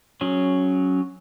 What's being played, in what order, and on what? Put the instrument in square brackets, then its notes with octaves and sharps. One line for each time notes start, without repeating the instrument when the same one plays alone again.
[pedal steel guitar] F#3 C#4 G#4